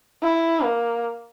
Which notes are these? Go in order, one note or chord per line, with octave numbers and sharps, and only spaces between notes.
E4
A#3